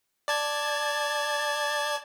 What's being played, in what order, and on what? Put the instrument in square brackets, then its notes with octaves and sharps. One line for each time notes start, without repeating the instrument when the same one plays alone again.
[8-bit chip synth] D5 A5 G#6